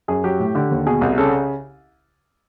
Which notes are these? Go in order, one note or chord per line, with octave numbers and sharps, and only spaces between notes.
F#2 G#4
F#3 G4
A2
D3 G4
D#2
B2 G#4
C2
C#3 A4